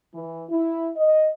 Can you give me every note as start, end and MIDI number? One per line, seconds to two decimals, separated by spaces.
0.15 0.44 52
0.50 0.91 64
0.97 1.29 75